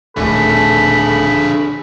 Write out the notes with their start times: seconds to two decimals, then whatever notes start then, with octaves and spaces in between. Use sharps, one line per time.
0.17 D#1 D3 A3 G#4 A4 B5